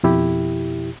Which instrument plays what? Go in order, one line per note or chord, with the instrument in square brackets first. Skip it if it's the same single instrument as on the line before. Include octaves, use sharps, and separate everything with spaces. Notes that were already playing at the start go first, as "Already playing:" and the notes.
[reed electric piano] F2 B2 E4 G4